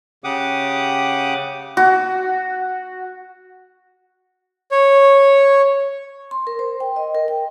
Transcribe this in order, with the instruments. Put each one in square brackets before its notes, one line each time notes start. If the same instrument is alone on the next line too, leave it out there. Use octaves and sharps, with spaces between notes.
[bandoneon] C#3 G4 F#5 D6 D#6
[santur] F#4
[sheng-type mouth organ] C#5
[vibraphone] C6
A#4
C5
G5
D#5
A#4
G5